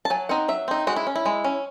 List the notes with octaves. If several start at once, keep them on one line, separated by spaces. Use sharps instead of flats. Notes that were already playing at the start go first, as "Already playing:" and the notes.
A5
F#3 G#5
C4 D#4 F#5
F#3 E5
C4 D#4
G#3 F#4
E4
C#4
E4
G#3
C#4